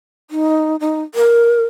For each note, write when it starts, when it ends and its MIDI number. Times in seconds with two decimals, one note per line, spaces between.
0.31 0.76 63
0.80 1.01 63
1.15 1.65 70